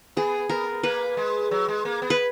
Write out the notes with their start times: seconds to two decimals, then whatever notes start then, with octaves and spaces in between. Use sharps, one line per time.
0.17 B3 G#4
0.49 B3 A#4
0.83 A#3 B4
1.17 G#3
1.51 F#3
1.68 G#3
1.85 A#3
2.02 B3
2.10 B4